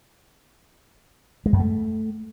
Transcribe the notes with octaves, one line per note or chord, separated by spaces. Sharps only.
G#3
F#2
A3